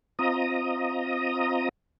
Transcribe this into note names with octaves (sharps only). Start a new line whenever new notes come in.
C4 F4 D#5 A#5 D#6